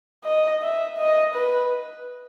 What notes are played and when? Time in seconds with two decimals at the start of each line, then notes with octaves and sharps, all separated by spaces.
0.25 D#5
0.62 E5
0.98 D#5
1.34 B4